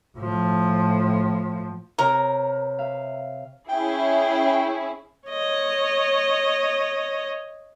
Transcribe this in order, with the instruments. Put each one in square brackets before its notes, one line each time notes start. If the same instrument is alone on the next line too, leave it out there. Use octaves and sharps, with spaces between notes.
[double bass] A2 F3
[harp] C3 B4 C#5 [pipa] A#4
[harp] E5 F5
[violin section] C#4 E4 G#4 [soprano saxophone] G5
[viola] C#5 D#5